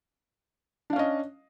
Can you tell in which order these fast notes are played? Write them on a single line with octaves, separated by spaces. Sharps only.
D4 F5 C#4 D#5